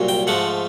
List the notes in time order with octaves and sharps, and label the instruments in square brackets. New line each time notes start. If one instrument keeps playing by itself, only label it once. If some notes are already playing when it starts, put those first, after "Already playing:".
Already playing: [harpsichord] C2 A#2 F#3
G5
G#2 F3 A3 F#5